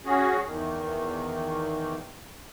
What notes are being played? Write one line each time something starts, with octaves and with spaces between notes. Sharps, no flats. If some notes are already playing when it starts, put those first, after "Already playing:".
C#4 F#4 G#4
E2 D#3